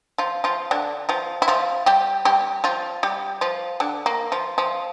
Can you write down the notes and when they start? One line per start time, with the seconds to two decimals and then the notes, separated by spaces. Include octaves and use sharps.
0.18 F3 F4
0.44 F3 F4
0.71 D3 D4
1.09 F3 F4
1.42 E4
1.48 F3 F4
1.86 G3 G4
2.25 G3 G4
2.64 F3 F4
3.03 G3 G4
3.41 F3 F4
3.80 D3 D4
4.06 A#3
4.32 F3 F4
4.58 F3 F4